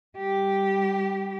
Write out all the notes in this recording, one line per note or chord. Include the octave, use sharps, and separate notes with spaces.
G3 G4